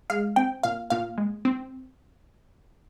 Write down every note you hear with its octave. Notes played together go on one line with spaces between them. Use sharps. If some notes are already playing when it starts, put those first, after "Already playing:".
G#3 F5
C4 G5
A#2 F5
A#2 F5
G#3
C4